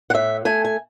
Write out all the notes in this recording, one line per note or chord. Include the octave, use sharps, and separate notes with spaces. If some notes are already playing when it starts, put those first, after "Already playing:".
F#5
A2 E5
A3 G#5
G#5